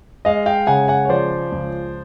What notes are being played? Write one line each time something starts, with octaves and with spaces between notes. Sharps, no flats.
G#3 D#5 F5
F5 G5
C#3 F#5 G#5
F#5 G#5
C#5
F3 C5 D5
C#2